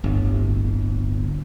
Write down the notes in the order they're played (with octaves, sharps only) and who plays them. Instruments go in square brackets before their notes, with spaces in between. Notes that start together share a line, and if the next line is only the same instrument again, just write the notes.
[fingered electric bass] D1 G1